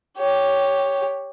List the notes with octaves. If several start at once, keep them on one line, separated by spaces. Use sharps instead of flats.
G4 C#5